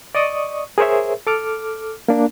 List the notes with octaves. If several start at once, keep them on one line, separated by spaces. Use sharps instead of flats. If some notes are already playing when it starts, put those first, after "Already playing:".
D5 D#5 C#6 D#6
G#4 A#4 C5 C#5 E5
A4 D6 F6
A#3 D4